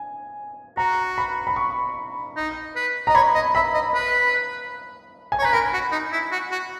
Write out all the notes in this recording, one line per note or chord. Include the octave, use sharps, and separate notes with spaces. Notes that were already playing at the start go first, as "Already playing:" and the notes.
Already playing: G#5
F#4 A#5
B5
B5
C#6
D#4
B4
D#5 A#5
C#5 B5
D#5
E5 B5
D#5
B4
G#5
C#5
B4 A#5
A#4 B5
F#4
D#4
E4
F#4
F#4